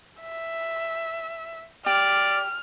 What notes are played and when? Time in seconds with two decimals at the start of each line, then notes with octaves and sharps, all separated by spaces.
0.21 E5
1.86 G4 D5 F6